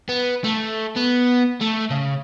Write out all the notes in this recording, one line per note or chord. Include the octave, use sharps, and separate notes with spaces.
B3
A3
B3
A3
C#3